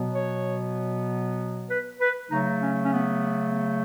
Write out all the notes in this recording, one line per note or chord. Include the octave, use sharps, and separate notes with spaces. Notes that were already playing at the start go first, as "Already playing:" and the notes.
Already playing: B2 F#3 B3
C#5
B4
B4
C#3 F#3 A3 D#4
C#4
C#4
B3